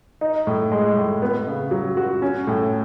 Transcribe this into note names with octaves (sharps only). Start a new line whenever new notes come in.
D#4
A2
G#3
A2
B3
C#3
F#3
F#4
C#4
A2